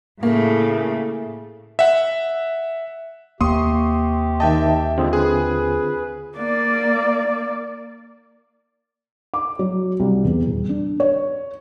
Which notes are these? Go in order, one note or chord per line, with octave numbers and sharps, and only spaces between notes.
A2 C#3 A3 A#3
E5 F#5
D#2 C3 A#3 G4 C6 C#6 D#6
D#3 D#5 E5 G5 A5
D3 G#3 C4 F4 G#4
G#4 B4
A#3 D5
D6
F#3
C2
E2
D#1
D4
C#5